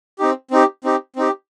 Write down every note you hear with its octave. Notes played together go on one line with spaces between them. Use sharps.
C4 D#4 G4
C4 D#4 G4
C4 D#4 G4
C4 D#4 G4